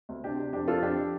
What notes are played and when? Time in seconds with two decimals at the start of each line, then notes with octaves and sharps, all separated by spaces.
0.09 D2
0.24 C3 D4 G4
0.38 C3
0.53 F2 D4 G4
0.67 F2 F4 A4
0.82 F2 D4 G4
0.97 F3